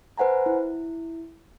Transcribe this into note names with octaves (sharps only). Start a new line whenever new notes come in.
B4 C5 F#5 G#5 A#5
E4